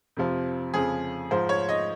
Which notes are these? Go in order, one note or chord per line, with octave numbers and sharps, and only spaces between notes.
F2 C3 F3
F2 C#3 F3 G#4
G#2 F3 C5
C#5
D#5